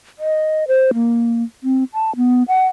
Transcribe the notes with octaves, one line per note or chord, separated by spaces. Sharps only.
D#5
C5
A#3
C4
A5
B3
F#5